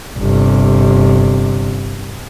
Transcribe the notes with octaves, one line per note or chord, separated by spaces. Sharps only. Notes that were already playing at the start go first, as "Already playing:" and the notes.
G1 C3